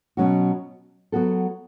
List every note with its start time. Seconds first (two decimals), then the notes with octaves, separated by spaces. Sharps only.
0.17 B2 F#3 C#4 F#4
1.12 F#3 B3 F#4 A4